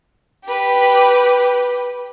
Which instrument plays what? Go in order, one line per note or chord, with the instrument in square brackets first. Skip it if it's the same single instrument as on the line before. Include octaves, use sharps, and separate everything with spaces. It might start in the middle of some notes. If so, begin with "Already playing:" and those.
[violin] G4 B4